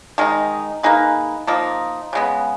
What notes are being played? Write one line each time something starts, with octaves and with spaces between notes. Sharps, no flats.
D#3 G#3 D#4
A#3 D#4 G#4 B4
F3 A#3 D#4
C#3 G#3 B3